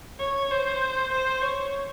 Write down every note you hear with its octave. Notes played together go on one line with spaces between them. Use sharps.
C#5
C5
C5
C#5